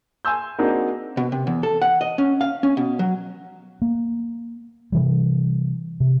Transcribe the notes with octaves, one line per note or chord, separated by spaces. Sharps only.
G#5 C6 E6 G6
A#3 C4 D4 D#4 F#4 G#4
B2
C3
E2
A4
F#5
D#5
C#4
F5
C#4
B2
F#3
A#3
C3 E3 G3
C3